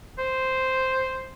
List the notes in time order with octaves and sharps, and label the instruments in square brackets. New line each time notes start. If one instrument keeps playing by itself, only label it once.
[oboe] C5